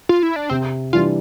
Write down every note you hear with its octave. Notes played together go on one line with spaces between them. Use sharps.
F4
E4
D4
C3 C4
E3 G3 D4 F4 G4